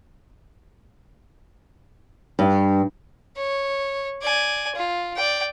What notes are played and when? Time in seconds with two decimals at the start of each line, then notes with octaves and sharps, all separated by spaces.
2.39 G2
3.36 C#5
4.22 D5 G#5
4.75 F4
5.16 D5 G5